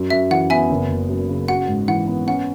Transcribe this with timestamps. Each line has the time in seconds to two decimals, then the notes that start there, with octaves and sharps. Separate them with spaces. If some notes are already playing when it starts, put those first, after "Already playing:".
Already playing: F#2
0.10 F#2 E5
0.31 E3 F#5
0.50 B3 E5 G#5
0.70 F#1
0.89 F#1
1.09 F#2
1.29 C#3
1.48 F#4 F#5
1.68 G#2
1.88 E3 F#5
2.07 B3
2.27 C#4 F#5